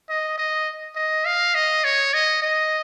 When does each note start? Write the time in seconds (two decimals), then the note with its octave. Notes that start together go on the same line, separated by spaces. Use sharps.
0.09 D#5
0.38 D#5
0.96 D#5
1.26 F5
1.55 D#5
1.85 C#5
2.14 D#5
2.42 D#5